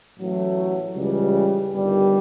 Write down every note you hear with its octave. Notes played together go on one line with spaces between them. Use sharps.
A1 A2 F#3 A3
C#2 C#3 E3 G3
G1 G2 D#3 G3